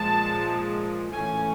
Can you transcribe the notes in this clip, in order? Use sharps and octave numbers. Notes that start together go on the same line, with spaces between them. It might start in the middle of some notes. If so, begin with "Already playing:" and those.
Already playing: A#2 F3 G#3 A5
A2 E3 A3 C#4 G#5